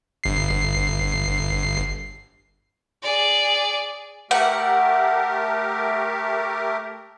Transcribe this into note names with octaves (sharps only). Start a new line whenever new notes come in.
G1 C7
G#4 D5
A3 G4 A#4 F#5